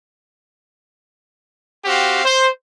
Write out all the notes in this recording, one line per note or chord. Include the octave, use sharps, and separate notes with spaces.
C4 F#4 G4 F5
C5